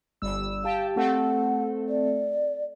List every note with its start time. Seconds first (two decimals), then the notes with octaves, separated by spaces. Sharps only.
0.22 G1 G3 E6
0.65 G4 F5 G5 A5
0.96 A3 C4 A4 F#5
1.89 D5